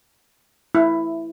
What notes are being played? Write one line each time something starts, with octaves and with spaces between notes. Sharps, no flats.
E4